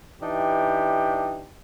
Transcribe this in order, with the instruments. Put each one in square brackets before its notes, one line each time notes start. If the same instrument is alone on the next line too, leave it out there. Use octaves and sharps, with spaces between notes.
[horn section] E3 D4 D#4 G4